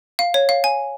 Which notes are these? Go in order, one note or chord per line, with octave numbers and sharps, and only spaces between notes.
F5
C#5
F5
G#5